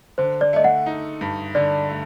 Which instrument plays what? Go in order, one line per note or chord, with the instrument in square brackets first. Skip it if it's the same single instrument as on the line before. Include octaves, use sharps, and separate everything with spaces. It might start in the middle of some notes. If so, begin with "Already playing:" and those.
[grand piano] D3 [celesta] C5
[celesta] D5
[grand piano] A3 [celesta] D#5
[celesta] F#5
[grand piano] D#4
G2
[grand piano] D3 [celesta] D5
[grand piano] A3